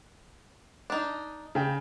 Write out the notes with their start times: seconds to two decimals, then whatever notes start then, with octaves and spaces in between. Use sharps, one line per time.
0.90 D4 D#4
1.55 C#3 G5